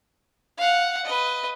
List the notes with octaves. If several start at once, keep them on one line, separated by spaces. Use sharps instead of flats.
F5 F#5
B4 D#5